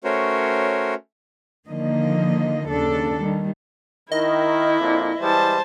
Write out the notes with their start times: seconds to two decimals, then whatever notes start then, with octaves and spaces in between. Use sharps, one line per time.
0.04 A3 C#4 F#4 A#4 C5 C#5
1.68 D3 D#3 F3 A#3 D#5
2.69 D#2 C#3 D4 A4
3.19 D#3 G3
4.12 D#3 E4 D#5
4.79 F2 A#2 D4
5.20 E3 G3 G#3 C5 A5